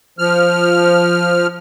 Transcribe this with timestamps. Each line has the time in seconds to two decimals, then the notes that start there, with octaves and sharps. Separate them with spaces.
0.19 F3 F6